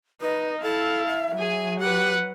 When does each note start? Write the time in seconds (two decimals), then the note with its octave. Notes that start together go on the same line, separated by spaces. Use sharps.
0.21 D#4 B4 D#5
0.63 E4 A4 F5 A5
1.07 E5
1.38 F#3 G#4 G#5
1.79 G4 B4 F#5